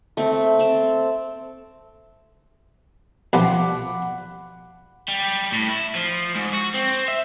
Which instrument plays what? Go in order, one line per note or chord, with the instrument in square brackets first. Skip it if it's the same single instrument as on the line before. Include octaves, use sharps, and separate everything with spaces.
[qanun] A3 C4
C4 A5
[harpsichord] B1 F3 G3 [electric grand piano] F#5 B5 D6
[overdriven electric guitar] G3
A2
E4
F3
G#2
F#4
C4
E5